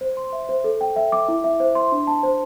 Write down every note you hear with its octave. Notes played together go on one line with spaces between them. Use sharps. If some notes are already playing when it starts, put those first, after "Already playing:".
C5
C6
E5
C5
A4
G5
E5
D6
E4
E5
C5
C6
D4
A5
C5